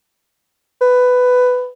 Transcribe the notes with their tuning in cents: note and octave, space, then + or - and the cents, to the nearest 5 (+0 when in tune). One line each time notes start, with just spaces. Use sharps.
B4 +10